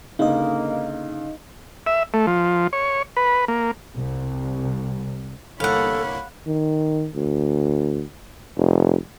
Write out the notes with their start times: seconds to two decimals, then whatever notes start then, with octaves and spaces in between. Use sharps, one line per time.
0.19 C#2 D3 A#3 D#4 D#5
1.86 E5
2.14 A3
2.27 F3
2.73 C#5
3.17 B4
3.48 A#3
3.97 C2
5.60 G1 C2 A#3 A4 C#5 F5 F#5 B5
6.47 D#3
7.14 D2
8.57 F1